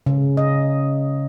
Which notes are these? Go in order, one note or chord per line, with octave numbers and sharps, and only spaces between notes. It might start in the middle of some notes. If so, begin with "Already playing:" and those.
C#3
D#5